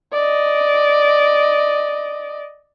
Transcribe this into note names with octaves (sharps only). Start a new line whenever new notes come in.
D5 D#5